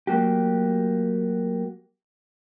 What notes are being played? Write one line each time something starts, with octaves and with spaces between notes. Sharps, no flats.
F#3 A3 A#3 F#4 G4